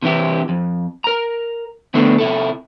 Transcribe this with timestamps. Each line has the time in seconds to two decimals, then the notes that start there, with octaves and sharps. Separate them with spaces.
0.02 C3 E3 E4 G4
0.49 F2
1.04 A#4 A#5
1.94 D3 A3 B3 D4 E4 A4
2.18 C3 E4 A4